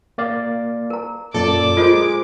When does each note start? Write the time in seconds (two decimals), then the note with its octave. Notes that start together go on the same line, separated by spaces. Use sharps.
0.18 A#3 D5 F5
0.90 A#4 A#5
1.34 F#2 A#2 A4 D5 D6
1.77 G#3 F4 A#4 C5 D#5